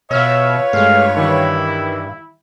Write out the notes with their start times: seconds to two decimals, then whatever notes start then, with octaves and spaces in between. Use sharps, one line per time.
0.11 B2 F4 B4 C#5 E5 E6 F6
0.73 G2 G#3 A3 F5
1.17 D#3 E3 G3 E4